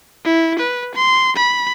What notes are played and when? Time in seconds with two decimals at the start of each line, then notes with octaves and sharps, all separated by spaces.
0.25 E4
0.59 B4
0.95 C6
1.36 B5